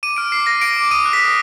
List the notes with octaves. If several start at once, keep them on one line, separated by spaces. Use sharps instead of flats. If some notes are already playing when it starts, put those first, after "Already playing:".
D6 D#7
F6 D7
D6 C7
F6 A#6
F6 D7
D6
D#6 D#7
F#6
B6
D#6